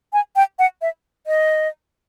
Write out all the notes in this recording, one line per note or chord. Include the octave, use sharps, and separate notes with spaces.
G#5
G5
F#5
E5
D#5